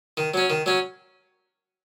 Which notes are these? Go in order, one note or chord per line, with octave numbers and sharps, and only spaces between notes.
D#3
F#3 C#4
D#3
F#3 C#4